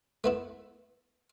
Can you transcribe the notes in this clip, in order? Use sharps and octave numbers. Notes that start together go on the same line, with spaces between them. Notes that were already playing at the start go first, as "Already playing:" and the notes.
A3 B3 E4